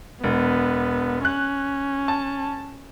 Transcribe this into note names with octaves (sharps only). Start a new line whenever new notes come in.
E1 B3
C#4 F#6
A5